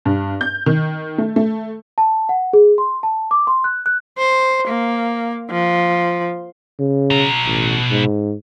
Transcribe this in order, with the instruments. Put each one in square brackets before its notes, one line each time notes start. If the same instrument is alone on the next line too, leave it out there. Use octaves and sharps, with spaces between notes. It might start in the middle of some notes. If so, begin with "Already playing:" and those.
[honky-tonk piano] G2
G6
D#3
A3
A3
[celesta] A5
F#5
G#4
C6
A5
D6
C6
F#6
F#6
[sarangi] C5
A#3
F3
[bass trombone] C#3
[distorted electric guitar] B2 A#5
[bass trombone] A1
G#2